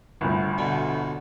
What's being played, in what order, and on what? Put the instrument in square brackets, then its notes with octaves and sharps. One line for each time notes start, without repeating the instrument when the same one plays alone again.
[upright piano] G1 D2
[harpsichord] B2 D3